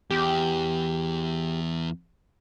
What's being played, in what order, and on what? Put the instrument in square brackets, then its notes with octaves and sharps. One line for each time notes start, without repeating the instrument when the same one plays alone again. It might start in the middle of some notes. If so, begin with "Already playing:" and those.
[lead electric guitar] E2 [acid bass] G4